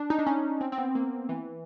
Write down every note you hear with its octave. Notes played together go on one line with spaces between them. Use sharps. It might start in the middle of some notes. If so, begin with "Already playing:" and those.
Already playing: D4
D#4
D4
C#4
C4
C4
B3
A#3
E3